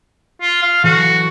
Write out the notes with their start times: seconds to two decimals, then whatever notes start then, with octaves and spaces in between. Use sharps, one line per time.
0.41 F4
0.63 F5
0.84 E3 F#3 F#4 A4